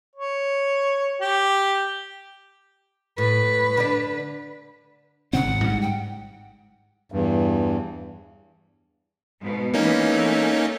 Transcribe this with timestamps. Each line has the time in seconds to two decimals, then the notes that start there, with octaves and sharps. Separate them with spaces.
0.16 C#5
1.21 G4
3.18 A2 B4
3.77 D3 D4
5.33 D#1 C#3 C4 F#5
5.45 G#1 C#2
5.64 G#2 G3
5.81 G5
7.12 E2 G2
9.41 G#2 B2
9.74 E3 G#3 A#3 B3 C#4 D#4
10.07 A3